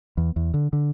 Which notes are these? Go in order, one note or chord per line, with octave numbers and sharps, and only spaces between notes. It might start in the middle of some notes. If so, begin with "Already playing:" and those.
E2
E2
D3
D3